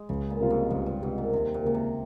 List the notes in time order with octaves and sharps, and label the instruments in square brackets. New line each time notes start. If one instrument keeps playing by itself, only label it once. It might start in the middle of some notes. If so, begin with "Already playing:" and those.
Already playing: [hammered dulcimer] G#3
[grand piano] C#2 [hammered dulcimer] C#3
[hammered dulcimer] A#2
[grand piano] C3 G3 C4 F4
[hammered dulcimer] G#2
[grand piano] C#2 [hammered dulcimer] G2
[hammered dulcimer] G2
[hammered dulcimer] G#2 [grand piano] C3 G3 C4 F4
[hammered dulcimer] A#2
[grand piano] D#2 [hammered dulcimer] C3
[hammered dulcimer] A#2
[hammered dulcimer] A#2 [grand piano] C#3 G#3
[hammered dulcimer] C3